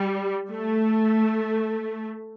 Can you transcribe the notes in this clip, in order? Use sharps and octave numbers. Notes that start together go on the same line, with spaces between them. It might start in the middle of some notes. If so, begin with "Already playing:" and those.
Already playing: G3
A3